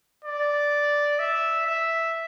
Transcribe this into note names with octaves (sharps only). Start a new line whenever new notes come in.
D5
E5
E5